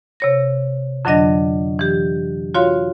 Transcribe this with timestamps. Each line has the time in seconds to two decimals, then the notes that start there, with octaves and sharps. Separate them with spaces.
0.20 C3 C#5 A#6
1.05 F2 D3 F#3 D4 D#5 A#6
1.79 E3 G4
2.54 F4 F#4 C#5 F5 C6